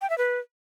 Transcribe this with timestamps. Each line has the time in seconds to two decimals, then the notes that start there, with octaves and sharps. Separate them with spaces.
0.02 G5
0.10 E5
0.18 B4